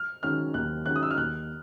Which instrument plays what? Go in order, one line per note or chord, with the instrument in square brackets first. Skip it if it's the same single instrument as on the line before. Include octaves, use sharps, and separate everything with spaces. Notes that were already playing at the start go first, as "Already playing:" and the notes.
Already playing: [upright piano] F6
[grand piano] D#3 G#3 C#4 F#4 [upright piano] F6
[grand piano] D#2 [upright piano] F#6
[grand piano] D#3 G#3 C#4 F#4 [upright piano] F#6
[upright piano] D#6
E6
F6
[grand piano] D#2 [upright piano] F#6